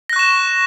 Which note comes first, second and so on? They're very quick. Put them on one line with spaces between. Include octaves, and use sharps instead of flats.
A#6 F#6 C#6 E7